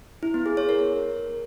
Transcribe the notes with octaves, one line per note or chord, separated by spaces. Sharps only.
E4
B3
G#4
C#5
A#4